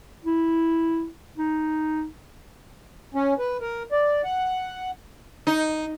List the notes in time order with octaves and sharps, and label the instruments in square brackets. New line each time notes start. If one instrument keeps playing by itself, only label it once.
[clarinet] E4
D#4
[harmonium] C#4
B4
A#4
D5
F#5
[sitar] D#4